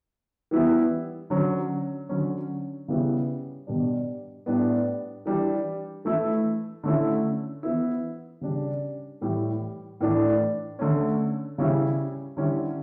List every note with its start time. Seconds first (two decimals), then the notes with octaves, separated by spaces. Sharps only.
0.51 E3 G3 B3 E4
1.30 D3 F#3 C#4
2.09 D3 F#3 C#4
2.88 C#3 G3 B3 E4
3.67 B2 G3 D4
4.46 A2 G3 B3 D4
5.26 E3 G3 D4
6.05 E3 A3 E4
6.84 D3 A3 C#4 E4
7.63 E3 B3 E4
8.41 C#3 G3 D4
9.21 A2 E3 G3
10.00 A2 E3 A3 D4
10.79 D3 A3 C#4
11.58 C#3 G3 C#4 E4
12.37 D3 G3 C#4 E4